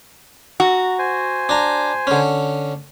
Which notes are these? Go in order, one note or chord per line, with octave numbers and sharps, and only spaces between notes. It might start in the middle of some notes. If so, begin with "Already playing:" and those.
F#4 A#5
C5 G#5
D4 A#5
D3 C#4